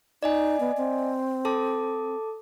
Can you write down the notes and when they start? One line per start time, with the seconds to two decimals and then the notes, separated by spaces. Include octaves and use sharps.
0.23 D#4 D5 D#5 G#5
0.60 B3
0.77 C4
1.45 A4 A5 D6